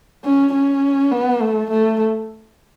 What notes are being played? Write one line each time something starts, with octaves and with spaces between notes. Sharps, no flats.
C#4
C#4
B3
A3
A3